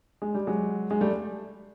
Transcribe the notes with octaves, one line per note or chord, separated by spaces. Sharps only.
G#3
G3
F#3 G#3
G#3
G3 A3